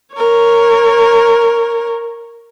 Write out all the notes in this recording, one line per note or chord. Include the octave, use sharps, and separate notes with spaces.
A#4 C#5